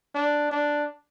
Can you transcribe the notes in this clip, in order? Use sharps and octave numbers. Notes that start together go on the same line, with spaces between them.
D4
D4